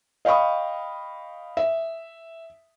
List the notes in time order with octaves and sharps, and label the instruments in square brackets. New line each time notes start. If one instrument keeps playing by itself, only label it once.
[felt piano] D#5 F5 G5 B5 C#6 D#6
E5